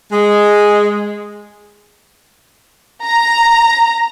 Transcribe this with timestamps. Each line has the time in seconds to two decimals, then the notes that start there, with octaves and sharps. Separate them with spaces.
0.12 G#3
3.04 A#5